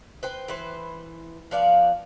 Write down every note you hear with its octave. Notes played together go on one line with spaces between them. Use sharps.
B4 C5 G5
E3 B4 C5
F3 B3 D5 F5